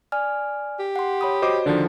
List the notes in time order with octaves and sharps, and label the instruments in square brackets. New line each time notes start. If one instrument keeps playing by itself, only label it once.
[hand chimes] D5 G#5 F6
[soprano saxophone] G4
[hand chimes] F#5 C6
C#5 B5 D#6
[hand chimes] F#4 [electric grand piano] C5 D#5 D6
[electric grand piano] D3 D#3 F3 [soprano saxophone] D4